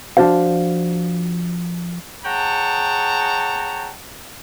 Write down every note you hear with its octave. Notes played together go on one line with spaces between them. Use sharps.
F3 D4 F#4 C5 F5
G#4 C#5 F#5 G5 A5 A#5